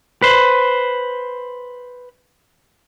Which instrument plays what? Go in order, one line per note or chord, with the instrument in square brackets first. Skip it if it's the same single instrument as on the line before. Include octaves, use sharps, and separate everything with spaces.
[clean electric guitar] B4 C5